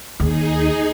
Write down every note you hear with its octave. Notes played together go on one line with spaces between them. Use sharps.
D#2 D#4 G#4